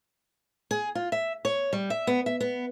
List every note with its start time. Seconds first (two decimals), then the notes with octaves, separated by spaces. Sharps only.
0.71 G#4
0.95 F4
1.12 E5
1.45 C#5
1.73 G3
1.90 E5
2.07 B3
2.26 E5
2.40 B3